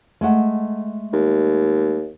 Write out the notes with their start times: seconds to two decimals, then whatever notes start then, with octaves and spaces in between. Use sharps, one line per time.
0.21 G#3 A3 F#5
1.13 D#2